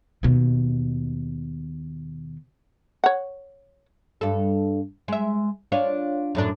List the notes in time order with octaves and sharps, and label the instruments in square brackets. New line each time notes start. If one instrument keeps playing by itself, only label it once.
[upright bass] D#2 B2
[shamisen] C#5 F#5
[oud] G2 A4
G#3 E5
D4 F4 C#5
F#2 A2 D4